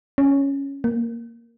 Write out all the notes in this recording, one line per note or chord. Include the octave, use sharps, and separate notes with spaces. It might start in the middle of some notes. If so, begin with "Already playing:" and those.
C#4
A#3